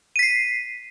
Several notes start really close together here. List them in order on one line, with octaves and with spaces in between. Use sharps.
D#7 B6 C7